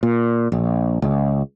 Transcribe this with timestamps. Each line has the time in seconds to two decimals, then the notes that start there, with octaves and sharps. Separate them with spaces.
0.03 A#2
0.52 A#1
1.02 C#2